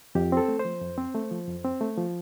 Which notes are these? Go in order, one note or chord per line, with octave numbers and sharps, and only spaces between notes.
F2 G4
C4 A4
A3
C5
F3
F2
C4
A3
F3
F2
C4
A3
F3